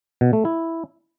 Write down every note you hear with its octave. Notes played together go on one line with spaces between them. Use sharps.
B2
A3
E4